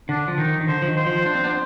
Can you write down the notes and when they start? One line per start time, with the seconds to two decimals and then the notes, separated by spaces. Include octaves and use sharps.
0.09 D3 D4
0.28 F3
0.38 D#3 D#4
0.61 D#3
0.67 D3 C5
0.82 F3
0.87 D#3
0.96 C5
1.06 F3
1.26 D4
1.35 C4
1.44 B3 D4